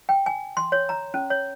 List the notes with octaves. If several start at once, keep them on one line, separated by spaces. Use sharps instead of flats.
G5
G#5
C6
C#5
A#5
C#4
C#5